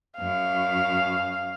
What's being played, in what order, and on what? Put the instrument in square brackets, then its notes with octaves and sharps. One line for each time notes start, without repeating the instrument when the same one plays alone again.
[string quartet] F#2 [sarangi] F5